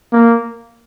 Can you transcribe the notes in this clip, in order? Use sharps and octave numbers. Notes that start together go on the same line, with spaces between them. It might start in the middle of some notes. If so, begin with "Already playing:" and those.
A#3